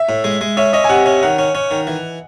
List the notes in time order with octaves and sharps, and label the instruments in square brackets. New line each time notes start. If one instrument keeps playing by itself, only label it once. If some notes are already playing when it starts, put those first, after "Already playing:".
Already playing: [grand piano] E5
[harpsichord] A2
G#3
G#3
[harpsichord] C#4 [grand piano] E5
[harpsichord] C#4 [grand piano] D#5
[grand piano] G#5
[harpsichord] C3 [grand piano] F#5
[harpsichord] C#4
[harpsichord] D#3 [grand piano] F#5
[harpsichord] C#4
C#4
D#3
E3